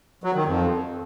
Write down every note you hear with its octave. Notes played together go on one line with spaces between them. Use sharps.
F#3
D#3
F2